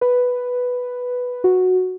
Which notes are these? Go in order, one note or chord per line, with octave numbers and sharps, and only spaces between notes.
B4
F#4